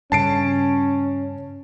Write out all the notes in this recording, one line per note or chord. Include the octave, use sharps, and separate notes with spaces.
G2 C#3 C#4 A5 C7 D7